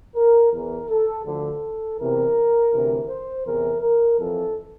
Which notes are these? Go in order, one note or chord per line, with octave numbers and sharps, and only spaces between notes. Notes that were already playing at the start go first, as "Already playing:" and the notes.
A#4
E2 E3 A#4
A4
D2 D3 F3 A4
E2 C3 E3 A#4
D2 C3 E3
C5
E2 C3 E3 A#4
A#4
F2 E3 A4